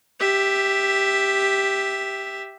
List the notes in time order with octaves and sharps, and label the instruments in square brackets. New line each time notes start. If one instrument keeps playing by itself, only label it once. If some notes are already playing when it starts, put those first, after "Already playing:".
[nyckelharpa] G4 E5